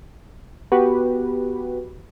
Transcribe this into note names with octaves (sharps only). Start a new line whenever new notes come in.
B3 F#4 G4 B4